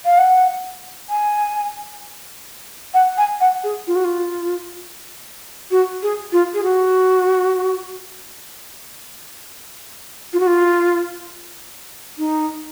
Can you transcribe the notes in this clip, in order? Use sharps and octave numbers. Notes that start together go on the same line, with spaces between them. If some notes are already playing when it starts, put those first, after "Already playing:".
F5
F#5
G#5
F#5
G#5
F#5
G#4
F4
F#4
F4
F#4
G#4
F4
G#4
F#4
F4
F#4
F4
D#4